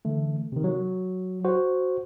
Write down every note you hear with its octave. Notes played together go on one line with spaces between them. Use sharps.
D3 E3 A3
C3 D#3
F#3
F#4 C5